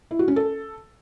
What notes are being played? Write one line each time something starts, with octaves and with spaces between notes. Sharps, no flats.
E4
F#4
C#4
A4